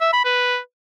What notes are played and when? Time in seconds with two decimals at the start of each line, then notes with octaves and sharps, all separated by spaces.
0.01 E5
0.13 B5
0.25 B4